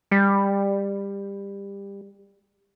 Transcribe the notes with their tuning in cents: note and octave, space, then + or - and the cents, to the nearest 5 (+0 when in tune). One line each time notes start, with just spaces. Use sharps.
G3 +20